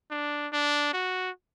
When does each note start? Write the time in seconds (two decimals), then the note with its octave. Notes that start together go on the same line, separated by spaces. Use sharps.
0.11 D4
0.53 D4
0.93 F#4